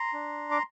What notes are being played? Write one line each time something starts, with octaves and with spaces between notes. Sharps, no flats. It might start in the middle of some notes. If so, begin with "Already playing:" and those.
Already playing: A#5 C6
D4
D6